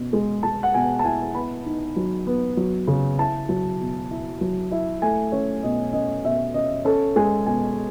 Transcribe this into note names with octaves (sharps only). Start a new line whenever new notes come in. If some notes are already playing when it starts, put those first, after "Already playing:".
Already playing: B2 C#4
G#3
G#3 A5
F#5
B2 G#5
A5
E4 G#5
B3 B5
D#4
F#3
B3
F#3
C#3
E4 A5
F#3
B2
E4
F#3
E4
A3 G#5
C#4 C#5
B2 D#5
C#4 D#5
B2 E5
C#4 D#5
C#4 A4
G#3 G#5
B2 G#5